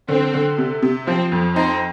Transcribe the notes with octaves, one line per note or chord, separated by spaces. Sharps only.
D3 C4
D3
C3
C3
F3 C4
F2
C4 D#4